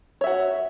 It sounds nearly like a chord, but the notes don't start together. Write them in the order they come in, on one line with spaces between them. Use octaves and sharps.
C#5 E5 F#4